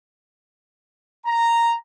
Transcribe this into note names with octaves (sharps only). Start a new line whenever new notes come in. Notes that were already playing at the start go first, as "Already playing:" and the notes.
A#5